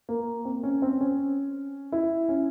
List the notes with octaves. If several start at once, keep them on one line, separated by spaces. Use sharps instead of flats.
A#3
C4
C#4
C4
C#4
E4
C#4